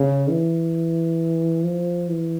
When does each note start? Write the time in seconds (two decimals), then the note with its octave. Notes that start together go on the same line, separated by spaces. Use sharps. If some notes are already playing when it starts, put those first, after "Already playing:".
Already playing: C#3
0.30 E3
1.64 F3
2.08 E3